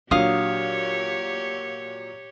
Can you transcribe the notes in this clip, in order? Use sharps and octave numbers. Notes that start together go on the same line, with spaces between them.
A#2 F#3 D4 G4 C#5 F5 D#6